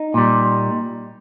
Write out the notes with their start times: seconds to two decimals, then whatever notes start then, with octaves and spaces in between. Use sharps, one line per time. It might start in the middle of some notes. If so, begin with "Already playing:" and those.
Already playing: D#4
0.14 A#2 G3